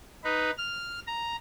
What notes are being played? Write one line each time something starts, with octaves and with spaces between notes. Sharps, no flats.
D#4 B4
F6
A#5